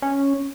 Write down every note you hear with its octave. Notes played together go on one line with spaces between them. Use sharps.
C#4